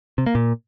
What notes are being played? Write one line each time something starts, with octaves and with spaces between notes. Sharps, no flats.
C3
A#3
A#2